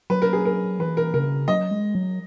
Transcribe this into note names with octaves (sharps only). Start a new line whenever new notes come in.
F#3 B4
A#4
G#4
A#4
E3 B4
A#4
C#3 A#4
F#3 D#5
G#3
F#3